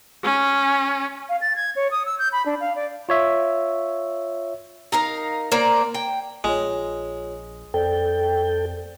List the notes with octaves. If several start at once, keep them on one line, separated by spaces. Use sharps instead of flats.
C#4
F5
A6
G#6
C#5
D#6
E6
G6
B5
D4
F5
D5
F4 C#5 E5
D#4 A#4 F5
A#3 A#4 C5 D5
G5
A#1 G#3 F4 G#4 C#5
F2 A4 C5 D5 G5